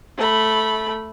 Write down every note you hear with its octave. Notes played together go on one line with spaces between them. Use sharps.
A3 B5